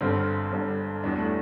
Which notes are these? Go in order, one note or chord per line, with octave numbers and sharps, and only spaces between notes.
G1 G2 D3 C4
G1 G2 D3
E1 E2 E3 G3 D4
A3